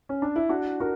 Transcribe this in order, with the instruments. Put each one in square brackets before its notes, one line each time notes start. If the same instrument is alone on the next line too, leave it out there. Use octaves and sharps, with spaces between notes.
[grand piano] C#4
D4
E4
D4 F#4
F#4 A#4